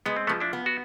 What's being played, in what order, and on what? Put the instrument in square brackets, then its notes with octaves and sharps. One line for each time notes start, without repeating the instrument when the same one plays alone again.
[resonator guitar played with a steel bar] G#3 [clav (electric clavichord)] B3
[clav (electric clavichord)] C4
[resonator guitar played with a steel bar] F3 [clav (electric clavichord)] A3 B3
[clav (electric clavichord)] D4 E4
[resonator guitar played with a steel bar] B3
[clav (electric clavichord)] F#4